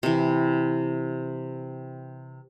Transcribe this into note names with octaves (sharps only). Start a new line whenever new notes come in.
C3 E3